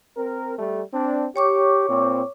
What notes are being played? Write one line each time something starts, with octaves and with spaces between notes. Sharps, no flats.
C4 A#4
G3 A3
C4 D4
G4 C#5 C#6 D6
A#2 C4